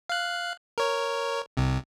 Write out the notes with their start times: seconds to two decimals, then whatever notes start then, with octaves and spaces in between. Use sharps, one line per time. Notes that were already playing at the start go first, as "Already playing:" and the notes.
0.09 F5 F#6
0.78 A#4 C#5
1.57 C2 C3